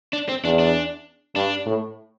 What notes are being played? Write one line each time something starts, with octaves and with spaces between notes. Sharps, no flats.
D4
C4
E2 D4
D4
G2 D4
A2